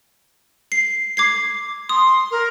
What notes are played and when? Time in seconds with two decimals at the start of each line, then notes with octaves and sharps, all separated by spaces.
0.72 C7
1.17 D6 G#6 C7
1.89 C6 D#6
2.31 A#4